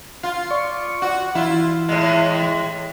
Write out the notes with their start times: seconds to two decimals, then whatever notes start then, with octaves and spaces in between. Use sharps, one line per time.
0.23 F4
0.51 D5 C#6
1.02 F#4
1.35 E3 E4 F4
1.88 A2 G#3